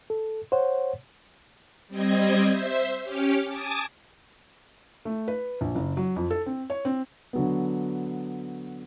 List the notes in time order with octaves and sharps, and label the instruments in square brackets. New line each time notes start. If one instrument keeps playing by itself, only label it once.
[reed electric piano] A4
C5 C#5 F#5
[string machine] G3 C4 D#5 G#6
C5 E5
C#4 G4 D6 F6 C#7
G#5 A5 D6 D#6
[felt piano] A3
B4
A#1
F#1
F#3
F2
A4
C4
C#5
C4
[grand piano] D3 F#3 B3